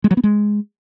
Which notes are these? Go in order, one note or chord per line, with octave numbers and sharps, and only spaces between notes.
G#3
F#3
B3
G#3